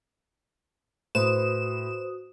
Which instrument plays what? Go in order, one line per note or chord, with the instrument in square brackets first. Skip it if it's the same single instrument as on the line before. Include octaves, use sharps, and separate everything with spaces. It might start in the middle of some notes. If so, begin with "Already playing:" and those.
[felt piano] A2 [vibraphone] F#4 D#6 [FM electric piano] B4 C5 [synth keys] E7